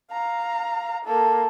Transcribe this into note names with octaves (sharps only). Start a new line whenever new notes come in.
F5 A#5
A#3 A4